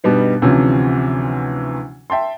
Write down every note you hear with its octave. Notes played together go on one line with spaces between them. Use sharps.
G2 B2 G3 B3 D#4
D2 C3 E3 F3 C#4
E5 G5 A5 C6